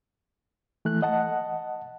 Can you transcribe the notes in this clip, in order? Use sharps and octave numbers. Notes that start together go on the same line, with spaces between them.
E3 A3 F#6
D#5 F#5 A5